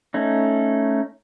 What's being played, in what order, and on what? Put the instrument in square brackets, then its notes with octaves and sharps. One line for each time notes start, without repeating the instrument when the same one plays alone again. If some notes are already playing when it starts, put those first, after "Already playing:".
[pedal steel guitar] A3 C#4 D#4